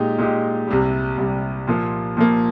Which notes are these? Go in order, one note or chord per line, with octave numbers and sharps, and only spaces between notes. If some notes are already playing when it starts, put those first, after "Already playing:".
Already playing: A#2 G#3 D#4 G4
A#2 G#3 D#4 G4
C2 C3 G3
C2 C3 G3
A#2 F3 A#3
A#2 F3 A#3